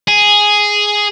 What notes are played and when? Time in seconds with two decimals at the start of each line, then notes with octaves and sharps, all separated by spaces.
0.08 G#4